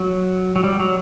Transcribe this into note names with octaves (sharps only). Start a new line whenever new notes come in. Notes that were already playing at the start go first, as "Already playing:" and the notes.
Already playing: F#3
F#3
G3
F#3